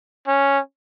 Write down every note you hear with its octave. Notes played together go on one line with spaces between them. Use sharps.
C#4